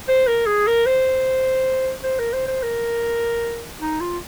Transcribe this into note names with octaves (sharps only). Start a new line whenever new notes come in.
C5
A#4
G#4
A#4
C5
C5
A#4
C5
C5
A#4
D#4
F4